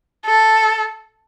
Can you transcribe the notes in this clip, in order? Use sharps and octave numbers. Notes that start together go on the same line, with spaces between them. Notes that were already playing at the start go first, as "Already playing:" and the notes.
A4